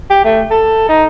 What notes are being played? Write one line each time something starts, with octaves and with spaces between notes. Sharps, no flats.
G4
A3
A4
D#4